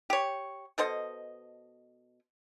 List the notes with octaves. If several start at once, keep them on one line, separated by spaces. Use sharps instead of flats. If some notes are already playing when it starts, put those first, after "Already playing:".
G4 C#5
B2 A4 C5 D#5